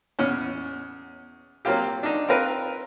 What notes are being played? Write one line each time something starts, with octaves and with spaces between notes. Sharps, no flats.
E2 B2 C#4
F#3 A#3 C4 F4 G4
D4 D#4
C4 F4 A#4 B4